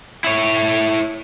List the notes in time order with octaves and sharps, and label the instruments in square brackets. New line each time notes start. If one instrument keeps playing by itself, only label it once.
[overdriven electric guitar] E4 C#5